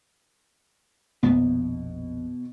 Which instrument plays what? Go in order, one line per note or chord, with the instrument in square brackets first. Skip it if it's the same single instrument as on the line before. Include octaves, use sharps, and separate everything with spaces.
[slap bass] A#1 F2 B3 [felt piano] B2